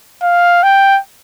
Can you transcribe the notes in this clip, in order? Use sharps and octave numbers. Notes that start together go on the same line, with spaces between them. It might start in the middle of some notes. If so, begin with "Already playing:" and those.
F5
G5